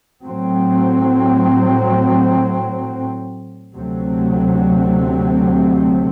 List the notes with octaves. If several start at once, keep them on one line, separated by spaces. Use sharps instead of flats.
A2 F#3 C4
D2 C3 F#3 A3 C4